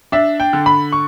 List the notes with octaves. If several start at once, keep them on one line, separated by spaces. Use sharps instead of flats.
D4 E5
G5
D3
B5
C#6